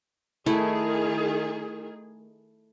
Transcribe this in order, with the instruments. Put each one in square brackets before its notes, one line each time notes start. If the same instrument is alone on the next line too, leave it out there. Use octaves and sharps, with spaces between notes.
[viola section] D#3 G#4 [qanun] A3 E4